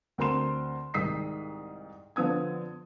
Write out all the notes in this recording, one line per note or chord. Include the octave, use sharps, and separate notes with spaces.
D2 C4 A#4 A#5 C6 E7
C2 G#2 D#3 D#6 B6 C7
D3 F3 B3 D#6 G#6